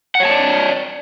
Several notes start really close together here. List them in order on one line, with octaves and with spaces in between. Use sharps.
F#5 C#5 A5 D5